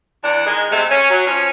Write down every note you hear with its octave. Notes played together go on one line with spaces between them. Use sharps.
E2 D4 F#5
D#3 G#3
C3 G#3 A3
C#4
F#3
F3 C#4